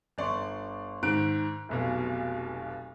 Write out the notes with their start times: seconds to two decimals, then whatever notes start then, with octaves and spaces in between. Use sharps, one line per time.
0.18 G1 D5 C6 C#6
1.03 G#2 D#3 F#6 D7
1.69 F1 B1 B2